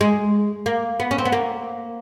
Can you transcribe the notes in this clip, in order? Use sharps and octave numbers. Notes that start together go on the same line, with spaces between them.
G#3
A#3
B3
C#4
C4
B3
A#3